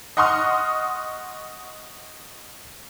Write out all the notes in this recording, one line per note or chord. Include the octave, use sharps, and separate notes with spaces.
D#5 F#5 C6 C#6 D#6 F6